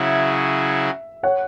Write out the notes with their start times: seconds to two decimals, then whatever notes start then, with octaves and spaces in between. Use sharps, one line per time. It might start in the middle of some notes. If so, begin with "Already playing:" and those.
Already playing: C#3 F#3 E4 G#4 E5
1.23 C#5 F#5